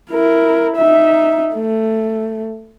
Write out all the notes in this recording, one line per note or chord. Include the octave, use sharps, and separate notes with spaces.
E4 A#4
D#4 E5
A3